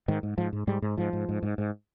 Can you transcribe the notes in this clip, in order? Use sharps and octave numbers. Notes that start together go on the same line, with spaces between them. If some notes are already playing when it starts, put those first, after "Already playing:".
G#2 D#3
G#2
G#2 F3
G#2
G#2 G3
G#2
G#2 F3
G#2
G#2
G#2
G#2